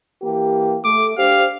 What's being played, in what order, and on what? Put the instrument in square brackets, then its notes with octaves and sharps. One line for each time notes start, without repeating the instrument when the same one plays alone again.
[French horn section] E3 A#3 G4
[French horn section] A3 [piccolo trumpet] D6
[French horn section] D4 G4 C5 [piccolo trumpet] F5